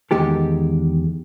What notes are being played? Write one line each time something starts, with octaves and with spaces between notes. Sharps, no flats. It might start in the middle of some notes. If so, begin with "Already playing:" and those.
E2 D#3 G#3 G4 A4